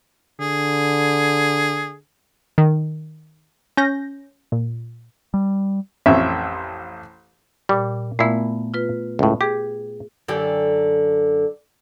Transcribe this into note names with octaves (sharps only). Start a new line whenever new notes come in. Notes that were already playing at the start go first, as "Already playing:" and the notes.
D3 G#4
D#3
C#4 G6 A#6
A#2
G3
A1 F2 C#4 E5
A#2 G3
A#2 A3 B3 E4
F4 B4
C#2 A2
G4 G#4
F#2 D3 G4